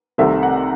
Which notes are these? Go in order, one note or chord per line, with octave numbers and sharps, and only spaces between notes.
C2 C3 D#3 A3 C4 E5
F#5